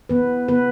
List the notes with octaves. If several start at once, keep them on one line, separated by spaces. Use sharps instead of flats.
E3 B3 B4
C#3 B3 B4